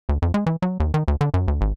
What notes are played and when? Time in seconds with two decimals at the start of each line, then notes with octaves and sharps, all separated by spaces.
0.09 D2
0.22 F2
0.34 G#3
0.46 E3
0.62 F#3
0.80 D#2
0.94 D#3
1.08 D2
1.21 D3
1.34 F#2
1.48 D2
1.61 G#1